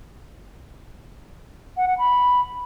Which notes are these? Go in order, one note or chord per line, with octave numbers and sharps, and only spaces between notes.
F#5
F#5
B5